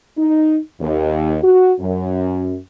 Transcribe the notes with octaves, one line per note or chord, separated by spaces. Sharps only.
D#4
D#2
F#4
F#2